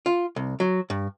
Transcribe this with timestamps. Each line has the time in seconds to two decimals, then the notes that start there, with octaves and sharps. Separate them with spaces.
0.06 F4
0.36 C2
0.60 F#3
0.90 G2